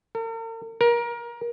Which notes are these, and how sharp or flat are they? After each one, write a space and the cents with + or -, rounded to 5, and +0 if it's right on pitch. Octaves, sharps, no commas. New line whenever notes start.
A#4 -45
A#4 +25